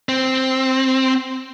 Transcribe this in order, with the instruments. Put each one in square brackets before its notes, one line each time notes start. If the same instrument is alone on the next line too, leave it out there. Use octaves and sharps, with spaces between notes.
[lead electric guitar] C4